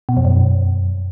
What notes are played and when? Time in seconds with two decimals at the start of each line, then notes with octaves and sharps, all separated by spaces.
0.09 B2
0.17 F2
0.25 F#2